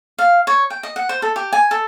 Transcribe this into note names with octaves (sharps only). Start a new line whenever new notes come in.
F5
C#5
G5
D#5
F#5
C5
A4
G4
G#5
A4